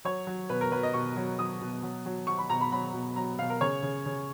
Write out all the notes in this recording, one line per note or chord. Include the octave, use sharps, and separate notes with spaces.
F#3 C#5
F#3
B2 B4
A#4
F#3 B4
D#5
B2 C#6
F#3
F#3 D#6
B2
F#3
F#3
F#3 C#6
B5
B2 A#5
B5
F#3 B5
B2
F#3 A#5
B2 F5
A#4
C#3 C#5
C#3
C#3